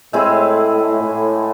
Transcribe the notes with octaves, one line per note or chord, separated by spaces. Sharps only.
A2 G#3 C4 E4 G#4
A2